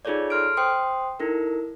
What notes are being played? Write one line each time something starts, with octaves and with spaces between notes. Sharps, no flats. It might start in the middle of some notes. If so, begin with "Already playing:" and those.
D#4 F4 G#4 A4 C#5 D5
A4 C6 F6 D7
C5 G5 C6 D#6
D#4 E4 A4 A#4